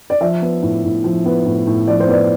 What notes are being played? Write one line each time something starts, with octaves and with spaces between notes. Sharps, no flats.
D5
F3 E5
B3
A2
A2
F3
B3
A2
A2
F3 D5
C5
B3 D5